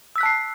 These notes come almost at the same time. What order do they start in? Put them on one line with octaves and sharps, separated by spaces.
E6 B6 F#6 A5 C7